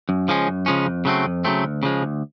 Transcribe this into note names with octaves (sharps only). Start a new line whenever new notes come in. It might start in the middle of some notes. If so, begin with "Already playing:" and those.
F#2
C#3 F3 G#3 C#4
F#2
C#3 F3 G#3 C#4
F2
C#3 F#3 A3 C4
F2
C#3 F#3 A3 C4
D2
C#3 F3 G#3
D2